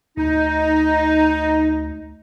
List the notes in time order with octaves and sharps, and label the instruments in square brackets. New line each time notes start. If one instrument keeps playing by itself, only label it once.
[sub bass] D2 [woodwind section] D#4